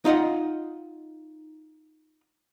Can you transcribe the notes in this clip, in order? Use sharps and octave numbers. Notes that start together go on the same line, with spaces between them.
D#4 F4 D#5 F#5